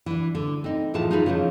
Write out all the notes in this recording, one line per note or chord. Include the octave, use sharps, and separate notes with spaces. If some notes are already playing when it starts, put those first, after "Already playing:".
E3 D4
D3
C4 D#4
A2 E3 F3 G#4 A5
D#4 F4 G#4 B4
C#3 E3 F3 D#4